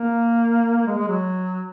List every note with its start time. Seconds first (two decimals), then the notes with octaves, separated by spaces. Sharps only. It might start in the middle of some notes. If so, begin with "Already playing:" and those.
Already playing: A#3
0.77 A#3
0.87 G#3
0.98 G#3
1.08 F#3